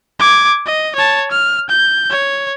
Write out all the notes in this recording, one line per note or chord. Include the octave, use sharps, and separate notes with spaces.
D6 G#6
D#5
C#5 A5
F6
G6
C#5